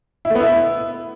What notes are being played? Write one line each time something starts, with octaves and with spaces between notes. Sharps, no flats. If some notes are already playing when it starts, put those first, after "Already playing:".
E4
A3
B3
E4